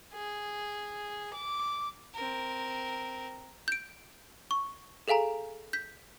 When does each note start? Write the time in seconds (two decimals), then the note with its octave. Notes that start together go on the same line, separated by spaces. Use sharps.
0.14 G#4
1.34 D6
2.14 C4 A#4
3.68 G6 D7
4.51 C#6
5.08 G#4 A4 F5 G#5 A#5
5.73 G6 B6